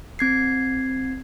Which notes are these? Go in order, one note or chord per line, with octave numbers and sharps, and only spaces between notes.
C4 G#6 C7